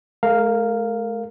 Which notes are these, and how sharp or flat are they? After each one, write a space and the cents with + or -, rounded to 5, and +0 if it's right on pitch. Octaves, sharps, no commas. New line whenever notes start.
G#3 +45 A#4 -15 F5 +0